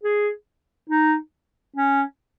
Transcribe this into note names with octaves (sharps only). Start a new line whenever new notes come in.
G#4
D#4
C#4